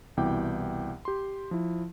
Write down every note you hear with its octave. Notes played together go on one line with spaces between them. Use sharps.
C2 B2 E3 G5 D6
G4 C6
F3 E4